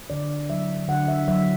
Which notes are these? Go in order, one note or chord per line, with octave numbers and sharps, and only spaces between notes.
D3 D5
F#3 E5
D3 F#5
E5
F#3 E5